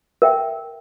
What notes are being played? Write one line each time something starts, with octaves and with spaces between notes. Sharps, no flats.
A#4 E5 G5